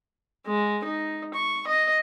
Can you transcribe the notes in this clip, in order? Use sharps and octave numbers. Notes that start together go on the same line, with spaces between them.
G#3
D#4
C#6
D#5